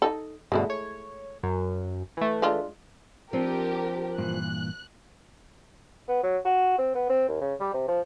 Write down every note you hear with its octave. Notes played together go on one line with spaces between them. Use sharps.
D#4 A4
G2 B2 D3 G#3 A3 E4
C#5
F#2
E3 A3
G#3 D4 F4
F3 C4 D4 G4 A#4
G2 A#2 E3 F#6
B3
F#3
F#4
C4
B3
C4
D#2
C#3
G3
C3
F3